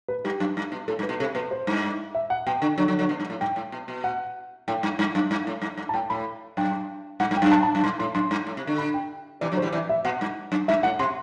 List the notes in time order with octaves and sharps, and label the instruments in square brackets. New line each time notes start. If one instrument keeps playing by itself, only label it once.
[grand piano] B4
[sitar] G2 [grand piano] G4
[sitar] F#2
G2
B2
[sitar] A2 [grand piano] A4
[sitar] G2
[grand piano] B4
[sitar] B2
[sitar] C3 [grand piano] A4
[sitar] B2 [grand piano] B4
[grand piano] C5
[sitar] G2
[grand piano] E5
F#5
[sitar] B2 [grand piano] G5
[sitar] D3
D3 F#3
D3 F#3
D3 F#3
B2
G2
A2
[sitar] G2 [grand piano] G5
[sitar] A2
B2
B2
[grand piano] F#5
[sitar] A2 [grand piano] G5
[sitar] G2
G2
F#2
G2
A2
G2
G2
[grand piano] A5
[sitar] A2 [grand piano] G5
[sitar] A2 [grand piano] B5
[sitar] F#2 [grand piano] G5
[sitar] G2 [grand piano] F#5
[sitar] G2
[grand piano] G5
[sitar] F#2
[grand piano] A5
A5
[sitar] F#2
[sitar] G2 [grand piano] C6
[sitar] A2 [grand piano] C6
[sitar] F#2 [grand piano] C6
[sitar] G2
A2
C3
D3
[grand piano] B5
G5
[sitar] C3 E3 [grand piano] D5
[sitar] D3 F#3
[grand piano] C5
[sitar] E3 G3
[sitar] C3 E3 [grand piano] D5
[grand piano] E5
[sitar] B2 [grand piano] F#5
[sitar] G2
F#2
[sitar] G2 [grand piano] E5
[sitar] A2 [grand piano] F#5
[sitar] C3 [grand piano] C6